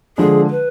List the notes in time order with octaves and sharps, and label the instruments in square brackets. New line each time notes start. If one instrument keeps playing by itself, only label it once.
[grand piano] D3 F3 G#3 D4 [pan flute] G#4
[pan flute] B4